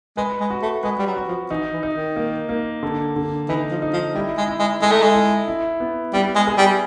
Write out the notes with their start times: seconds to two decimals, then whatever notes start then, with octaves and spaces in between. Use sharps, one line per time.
0.17 G#3 B4
0.40 G#3
0.50 F#4
0.62 A3
0.83 G#3 B4
0.99 G3
1.06 F#3
1.17 F#4
1.28 F3
1.50 E3 D#4
1.73 E3
1.83 D#4
1.95 D#3
2.16 A#3
2.49 A#3
2.83 D3
3.16 D3
3.48 E3 D#4
3.71 F3
3.82 D#4
3.93 F3
4.14 G3 E4
4.37 G#3
4.48 E4
4.59 G#3
4.82 G#3 A4
4.92 A3
5.02 G#3
5.14 E4
5.48 E4
5.80 B3
6.13 G3 B3
6.35 G#3
6.47 G#4
6.58 G3